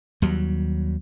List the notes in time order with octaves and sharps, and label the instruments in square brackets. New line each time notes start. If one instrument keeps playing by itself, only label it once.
[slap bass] D#2 F#3 G3